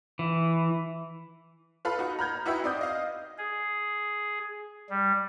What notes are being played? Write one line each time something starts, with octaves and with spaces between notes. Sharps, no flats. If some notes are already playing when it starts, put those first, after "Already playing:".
E3
F4 A4 B4 F5 B5
D#4 F#4
A#5 B5 F6 G6 G#6
D#4 E4 F#4 B4 E5 G5
C4 D5 D#6 G6
D#5 F5
G#4
G3